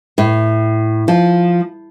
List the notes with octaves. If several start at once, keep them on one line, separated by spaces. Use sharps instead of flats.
A2
F3